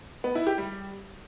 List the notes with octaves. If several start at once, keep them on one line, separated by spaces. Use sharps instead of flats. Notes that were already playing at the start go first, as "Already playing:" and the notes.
B3
E4
G4
G3